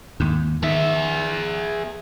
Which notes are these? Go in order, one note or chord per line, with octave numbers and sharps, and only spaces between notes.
D#2 G#2
D#3 G#4 E5